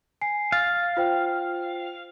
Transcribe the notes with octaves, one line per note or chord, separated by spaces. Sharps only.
G#5 C7
F5 A6
F4 C5 G5